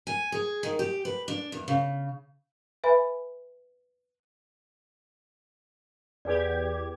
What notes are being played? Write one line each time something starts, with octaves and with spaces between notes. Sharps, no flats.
G#5
G#4
D#3
G4
B4
D4
E2
C#3
B4 E5 G#5 B5
E2 G4 G#4 B4 D5 G#6